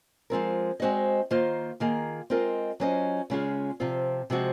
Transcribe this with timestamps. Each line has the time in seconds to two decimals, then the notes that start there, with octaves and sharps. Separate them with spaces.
0.30 F3 G#3 C4 F4 A#4
0.80 G#3 C4 F#4 C5 D#5
1.31 D#3 A#3 F4 C5
1.80 D#3 A#3 F4 G#4
2.30 G#3 C4 F4 A#4 D#5
2.80 F#3 C#4 F4 C5 D#5
3.30 C#3 G#3 C#4 F4 G#4
3.80 C3 F3 C4 F4
4.30 C3 F3 G#3 C4 F#4